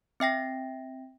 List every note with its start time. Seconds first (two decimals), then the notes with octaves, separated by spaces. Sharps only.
0.20 C4 E5 G5 A#6